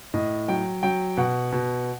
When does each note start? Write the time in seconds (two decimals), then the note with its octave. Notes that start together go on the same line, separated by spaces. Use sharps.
0.14 A2 D#5
0.48 F#3 G5
0.83 F#3 G5
1.17 B2 F#5
1.53 B2